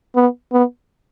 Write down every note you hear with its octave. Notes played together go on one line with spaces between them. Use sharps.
B3
B3